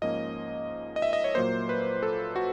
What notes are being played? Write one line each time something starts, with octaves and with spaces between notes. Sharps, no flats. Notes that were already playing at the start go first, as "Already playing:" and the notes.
G#2 F3 A#3 C#4 D#5
D#5
E5
D#5
C#5
A#2 F#3 A#3 C5
B4
A4
F#4